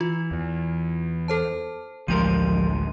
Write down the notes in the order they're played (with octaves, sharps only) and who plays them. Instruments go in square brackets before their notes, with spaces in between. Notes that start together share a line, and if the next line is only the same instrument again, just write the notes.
[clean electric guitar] E3 [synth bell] F4
[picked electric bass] E2
[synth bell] A4 C5 A5
[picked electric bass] A1 D2 G#3 [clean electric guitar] F3 G4 A#4 [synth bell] C6 D#7